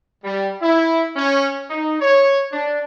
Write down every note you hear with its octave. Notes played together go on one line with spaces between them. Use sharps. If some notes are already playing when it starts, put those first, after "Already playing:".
G3
E4
C#4
D#4
C#5
D4